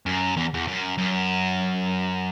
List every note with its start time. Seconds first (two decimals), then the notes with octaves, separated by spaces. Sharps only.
0.06 F#2
0.36 E2
0.54 E2
0.68 F#2
0.98 F#2